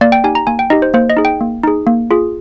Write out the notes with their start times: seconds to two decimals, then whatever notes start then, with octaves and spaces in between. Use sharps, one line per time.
0.01 A#3 D5
0.12 G5
0.24 D#4 G4 G#5
0.35 A#5
0.47 A#3 G#5
0.59 G5
0.70 D#4 G4 D#5
0.82 C5
0.94 A#3 C5
1.10 D#5
1.17 D#4 G#4
1.25 G5
1.41 A#3
1.63 D#4 G#4
1.87 A#3
2.11 F4 G#4